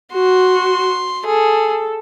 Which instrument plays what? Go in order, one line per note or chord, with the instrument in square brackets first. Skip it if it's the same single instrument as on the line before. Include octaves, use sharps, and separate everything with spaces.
[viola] F#4 [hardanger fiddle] C6
[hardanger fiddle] G#4 [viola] A4